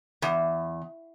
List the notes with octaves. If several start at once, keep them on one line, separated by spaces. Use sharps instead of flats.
E2